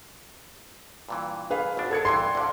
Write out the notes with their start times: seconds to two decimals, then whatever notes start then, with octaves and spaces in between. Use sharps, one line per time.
1.09 G2 A#2 E3
1.50 G#4 B4 F5
1.77 G#1 B2 D4
1.91 A4 G#6 C#7
2.05 C2 G2 E3 C6 G#6 C7
2.35 D2 D3 D5 F5